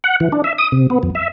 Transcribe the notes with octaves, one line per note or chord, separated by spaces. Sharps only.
F#5
E3
D4
E5
D#6
C3
B3
F2
E5